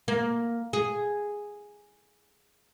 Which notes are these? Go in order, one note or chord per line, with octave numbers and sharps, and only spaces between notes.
A#3
G#4